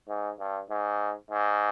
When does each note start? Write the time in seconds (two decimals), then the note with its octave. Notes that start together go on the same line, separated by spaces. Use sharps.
0.09 G#2
0.39 G2
0.70 G#2
1.31 G#2